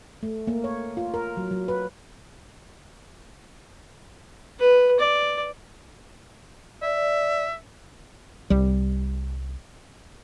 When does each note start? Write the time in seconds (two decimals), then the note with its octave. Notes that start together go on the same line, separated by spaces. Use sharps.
0.23 A3
0.47 A#3
0.64 C#5
0.97 F4
1.14 A#4
1.37 F#3
1.51 F#3
1.68 B4
4.59 B4
5.00 D5
6.82 D5 E5
8.50 C2 G3